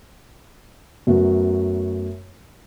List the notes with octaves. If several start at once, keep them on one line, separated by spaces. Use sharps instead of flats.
F#2 F#3 A3 B3 F#4